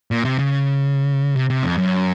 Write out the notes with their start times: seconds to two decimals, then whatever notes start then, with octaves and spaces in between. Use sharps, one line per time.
0.11 A#2
0.25 C3
0.39 C#3
1.36 C3
1.50 C3
1.64 F2
1.78 F#2